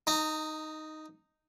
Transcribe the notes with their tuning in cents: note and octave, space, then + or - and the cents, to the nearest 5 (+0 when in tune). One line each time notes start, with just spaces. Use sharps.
D#4 +0 A#5 -25